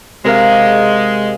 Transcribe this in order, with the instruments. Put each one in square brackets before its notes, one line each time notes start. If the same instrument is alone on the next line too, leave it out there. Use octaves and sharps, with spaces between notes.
[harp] C3 A#4 F5 [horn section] G#3